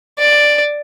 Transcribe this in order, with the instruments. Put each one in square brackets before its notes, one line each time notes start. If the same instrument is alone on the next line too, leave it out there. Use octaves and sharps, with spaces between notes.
[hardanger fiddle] D5